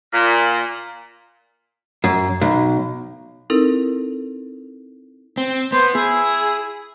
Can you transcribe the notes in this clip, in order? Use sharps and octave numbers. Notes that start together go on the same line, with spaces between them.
A#2
F#2
B1
C4 D#4 E4 A4 A#4
C4
B3 C5
E4 G#4